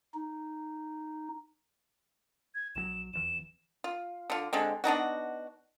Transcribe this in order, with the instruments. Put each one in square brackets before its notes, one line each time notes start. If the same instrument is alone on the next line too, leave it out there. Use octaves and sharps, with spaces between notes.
[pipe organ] D#4
[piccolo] G#6
[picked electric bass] A#1 D#3 F#3 [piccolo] E7
[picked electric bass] F1 E2 E3 [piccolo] E7
[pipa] F4
D3 F4
D3 G#3 C4
B3 D4 D#4 F#4